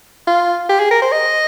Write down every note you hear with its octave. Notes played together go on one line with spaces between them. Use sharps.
F4
G4
G#4
A#4
C5
D#5